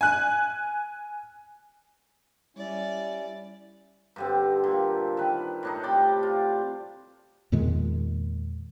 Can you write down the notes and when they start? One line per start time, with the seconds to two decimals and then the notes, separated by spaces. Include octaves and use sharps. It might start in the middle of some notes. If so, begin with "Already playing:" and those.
0.01 G#5 F#6
2.57 G3 C#4 E4 D5
4.16 G2 D3 C4
4.64 A#2
5.17 D#3 B4
5.63 A2 D4 D#4
5.83 C3 D5 G5 B5
6.23 F4
7.52 E2 A#2 D#3 G#3